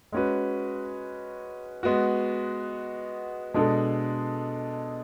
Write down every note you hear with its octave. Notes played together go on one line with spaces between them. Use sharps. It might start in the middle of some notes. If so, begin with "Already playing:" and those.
G#3 C#4 F#4 B4
G#3 B3 F#4
B2 G#3 D4 A4